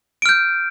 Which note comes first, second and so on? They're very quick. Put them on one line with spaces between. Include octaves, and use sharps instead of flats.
D7 F6 G6